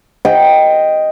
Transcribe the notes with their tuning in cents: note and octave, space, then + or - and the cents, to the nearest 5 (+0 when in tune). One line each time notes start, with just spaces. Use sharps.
D#5 +0 G5 +0